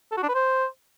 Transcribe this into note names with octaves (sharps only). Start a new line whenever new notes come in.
A4
F#4
D4
B4
C5